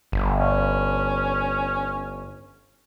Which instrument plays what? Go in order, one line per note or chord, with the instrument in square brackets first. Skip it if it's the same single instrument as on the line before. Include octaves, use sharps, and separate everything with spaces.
[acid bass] G1
[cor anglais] C#4